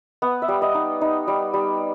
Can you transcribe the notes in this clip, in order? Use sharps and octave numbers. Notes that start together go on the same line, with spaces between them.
B3 F#5
E5
G3
D#5
D#4
D#4
G3
G3